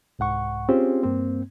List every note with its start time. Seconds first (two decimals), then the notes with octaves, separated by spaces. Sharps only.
0.19 C2 G#2 F#5 C#6
0.69 C4 C#4 F4 G4 G#4 C5
1.03 G2 A#3 C4